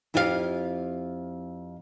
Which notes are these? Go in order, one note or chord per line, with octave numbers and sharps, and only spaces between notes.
F2 E4 F4 G4 A4 F5